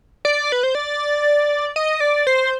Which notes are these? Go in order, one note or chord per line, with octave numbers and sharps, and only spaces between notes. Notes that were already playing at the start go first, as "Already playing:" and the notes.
D5
B4
C5
D5
D#5
D5
C5